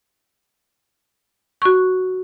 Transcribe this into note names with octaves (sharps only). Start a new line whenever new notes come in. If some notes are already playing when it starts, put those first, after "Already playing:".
F#4 C#6